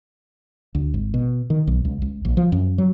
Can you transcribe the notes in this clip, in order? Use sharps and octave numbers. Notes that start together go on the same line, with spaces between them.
D2
G#1
B2
D#3
B1
C#2
C#2
A#1
F3
F#2
F#3